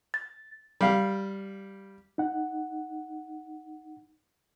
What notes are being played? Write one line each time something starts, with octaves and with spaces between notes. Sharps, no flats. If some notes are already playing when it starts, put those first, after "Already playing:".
A6
G3 F5
D#4 F#5